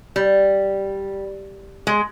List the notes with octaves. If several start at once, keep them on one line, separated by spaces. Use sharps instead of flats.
G3
G#3